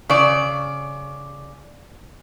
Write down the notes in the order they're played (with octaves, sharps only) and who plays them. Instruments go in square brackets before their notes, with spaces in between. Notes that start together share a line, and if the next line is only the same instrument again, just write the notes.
[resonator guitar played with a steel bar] C#3 D5